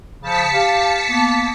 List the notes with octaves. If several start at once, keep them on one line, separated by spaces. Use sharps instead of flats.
C#3 F3 A5 B6 C#7
G4 F5
A#3 B3